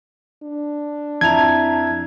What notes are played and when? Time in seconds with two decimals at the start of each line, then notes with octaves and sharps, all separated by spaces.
0.43 D4
1.21 F2 E4 A5 A#5 G#6 F7